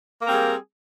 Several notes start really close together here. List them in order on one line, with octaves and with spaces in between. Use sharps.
A#3 A#4 C4 G3 G#4